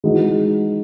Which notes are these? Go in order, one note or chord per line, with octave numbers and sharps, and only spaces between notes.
E3 G#3 D#4 F#4